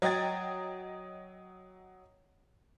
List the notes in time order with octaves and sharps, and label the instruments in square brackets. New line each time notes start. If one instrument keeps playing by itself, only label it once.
[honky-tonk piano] F#3 D#5 G5 G#6 A6